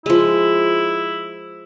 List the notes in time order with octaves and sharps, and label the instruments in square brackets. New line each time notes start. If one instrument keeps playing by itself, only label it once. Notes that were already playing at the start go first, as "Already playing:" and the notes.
[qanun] F3 G#3 [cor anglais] E4